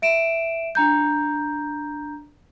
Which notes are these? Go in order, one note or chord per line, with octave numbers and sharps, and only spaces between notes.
E5 D7 E7
D4 A#5 G6